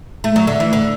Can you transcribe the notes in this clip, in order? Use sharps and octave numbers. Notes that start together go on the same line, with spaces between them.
A3
F#3
D3
E3
D3